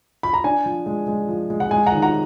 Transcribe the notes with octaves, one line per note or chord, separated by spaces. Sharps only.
B5
A#5
D4 G#5
F3
G#3
G#3
F3
G#3
F#5
G#3 G#5
F#5 A#5
D#3
F#5 A#5